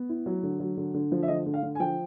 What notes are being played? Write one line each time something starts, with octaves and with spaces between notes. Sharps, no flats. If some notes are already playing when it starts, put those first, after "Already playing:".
Already playing: B3
E4
F#3
D3
F#3
D3
D3
F3
E5
D3 D#5
D3
F5
D3
G#5
F3 G5